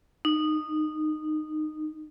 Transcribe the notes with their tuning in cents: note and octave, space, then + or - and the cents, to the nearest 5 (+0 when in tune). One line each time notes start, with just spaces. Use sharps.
D#4 -15